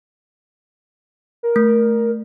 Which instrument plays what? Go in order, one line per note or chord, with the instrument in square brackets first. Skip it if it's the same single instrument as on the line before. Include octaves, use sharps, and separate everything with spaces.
[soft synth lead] A#4
[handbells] A3